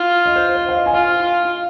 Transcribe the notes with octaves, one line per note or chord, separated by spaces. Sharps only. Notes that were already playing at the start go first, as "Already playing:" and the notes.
Already playing: F4
D#5
C5
C5
F5
D#5
G#5
F4 F5
F4